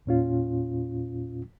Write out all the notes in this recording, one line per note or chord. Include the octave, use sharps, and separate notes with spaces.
E2 A#2 C#4 F4